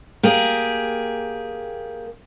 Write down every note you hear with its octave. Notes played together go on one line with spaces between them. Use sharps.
A#3 G4 G#4